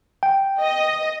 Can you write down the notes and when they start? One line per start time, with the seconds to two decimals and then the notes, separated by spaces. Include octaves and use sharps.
0.23 G5
0.61 D#5